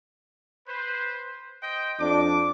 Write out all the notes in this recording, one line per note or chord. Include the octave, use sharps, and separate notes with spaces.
B4 C5
C5 D#5 G5
F2 D4 D6